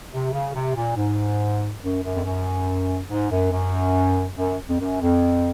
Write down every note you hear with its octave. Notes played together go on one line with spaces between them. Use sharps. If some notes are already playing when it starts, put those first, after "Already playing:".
C3
C#3
C3
A#2
G#2
F#2
F#2
F2
F#2
G#2
F#2
F#2
F#2
F2
F#2
F2